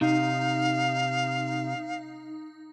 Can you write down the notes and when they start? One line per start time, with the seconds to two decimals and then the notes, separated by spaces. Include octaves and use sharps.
0.01 C3 D#4 F5